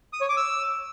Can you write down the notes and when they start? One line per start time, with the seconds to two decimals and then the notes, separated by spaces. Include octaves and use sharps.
0.13 D#6
0.21 C#5
0.29 D6
0.37 E6